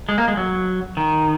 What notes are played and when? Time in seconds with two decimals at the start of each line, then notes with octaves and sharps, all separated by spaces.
0.09 G#3
0.18 A#3
0.28 G#3
0.37 F#3
0.97 D#3